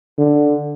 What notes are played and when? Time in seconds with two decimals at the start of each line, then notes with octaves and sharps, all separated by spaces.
0.18 D3